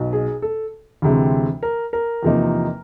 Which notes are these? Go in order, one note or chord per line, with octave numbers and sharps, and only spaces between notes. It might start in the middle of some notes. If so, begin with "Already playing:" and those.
Already playing: B1 B2
G#4
A4
D2 C3 E3 G#3 C4
A#4
A#4
E2 C3 F3 A#3 D#4